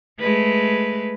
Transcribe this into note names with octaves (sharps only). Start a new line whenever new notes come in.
G#3 A3 B4